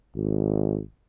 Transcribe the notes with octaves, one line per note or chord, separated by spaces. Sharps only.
G#1